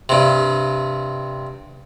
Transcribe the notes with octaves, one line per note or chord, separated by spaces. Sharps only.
G2 C3